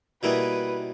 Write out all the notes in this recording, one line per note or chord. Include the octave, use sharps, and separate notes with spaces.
B2 G3 A#3 E4 G#4 B4